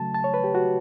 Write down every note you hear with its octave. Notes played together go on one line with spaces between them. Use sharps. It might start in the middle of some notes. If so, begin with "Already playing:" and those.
Already playing: C#3 F#3 A3 A5
A5
C#5
B4
G4
F#4